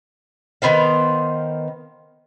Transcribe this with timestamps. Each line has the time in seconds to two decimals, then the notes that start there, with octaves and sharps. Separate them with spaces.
0.62 D#3 B3 C5 F5